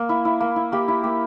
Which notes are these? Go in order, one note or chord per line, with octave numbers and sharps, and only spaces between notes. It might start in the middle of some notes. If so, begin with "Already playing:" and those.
Already playing: A#3
E4
E4
A#3
E4
A#3 G4
E4
A#3 G4